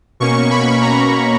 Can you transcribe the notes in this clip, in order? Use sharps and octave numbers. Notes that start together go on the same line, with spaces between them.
B2 A#3 C#4 C#6
B5
A#5